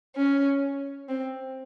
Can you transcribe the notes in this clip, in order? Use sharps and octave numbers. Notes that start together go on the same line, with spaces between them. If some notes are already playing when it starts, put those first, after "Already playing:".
C#4
C4